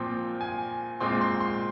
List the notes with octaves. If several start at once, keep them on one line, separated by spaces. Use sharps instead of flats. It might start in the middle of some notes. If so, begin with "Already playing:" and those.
Already playing: A#2 F3 C4 G5
G#5
A#2 G#3 C4 C6
C6
C6